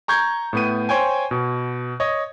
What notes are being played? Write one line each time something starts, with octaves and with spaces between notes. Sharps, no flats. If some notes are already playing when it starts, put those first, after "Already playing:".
A#5 C#6 G6 G#6
A2 B3 D#7
C5 C#5 G5 G#5
B2
C#5 D#5